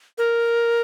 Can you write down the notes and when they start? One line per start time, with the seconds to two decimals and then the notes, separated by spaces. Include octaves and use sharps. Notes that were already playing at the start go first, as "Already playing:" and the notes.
0.18 A#4